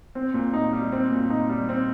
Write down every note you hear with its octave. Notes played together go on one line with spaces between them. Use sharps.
C4
A#2
D#4
G3
C4
A#2
D#4
G3
C4